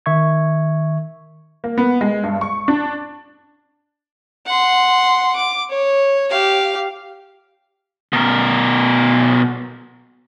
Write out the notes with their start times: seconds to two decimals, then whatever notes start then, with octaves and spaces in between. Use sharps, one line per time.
0.06 D#3 E5 C#6 G#6
1.64 A#3
1.78 B3
2.01 G#3
2.24 G2
2.41 C#6
2.68 D4
4.47 F#5 C6
5.36 D6
5.70 C#5
6.30 G4 F5
8.13 B2 A#4